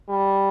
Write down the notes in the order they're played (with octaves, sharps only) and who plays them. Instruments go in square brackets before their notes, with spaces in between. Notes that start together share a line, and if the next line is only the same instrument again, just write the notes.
[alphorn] G3